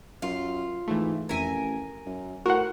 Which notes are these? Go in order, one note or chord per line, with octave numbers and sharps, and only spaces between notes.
F#2 F4
G#2 E3 A3
A1 F2 A#4 E5 G#5 G#6
F#2
A2 F#4 A#4 C5 F#5